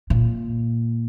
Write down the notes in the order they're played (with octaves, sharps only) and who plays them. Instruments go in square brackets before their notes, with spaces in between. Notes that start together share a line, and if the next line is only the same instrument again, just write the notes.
[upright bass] A#2